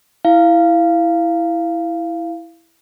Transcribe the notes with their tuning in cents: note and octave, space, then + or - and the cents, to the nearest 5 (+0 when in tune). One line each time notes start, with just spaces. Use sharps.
E4 +0 F5 -15